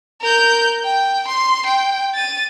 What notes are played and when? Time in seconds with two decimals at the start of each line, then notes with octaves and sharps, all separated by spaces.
0.21 A#4 G6
0.84 G5
1.28 C6
1.66 G5
2.14 A6 D#7